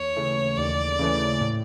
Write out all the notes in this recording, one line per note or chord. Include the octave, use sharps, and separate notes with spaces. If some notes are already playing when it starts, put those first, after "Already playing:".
Already playing: D#2 C#5
C#3 E3 A3
D#2 D5
C#3 E3 A3
A2